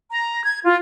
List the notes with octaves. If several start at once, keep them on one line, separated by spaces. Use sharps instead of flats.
A#5
G#6
F4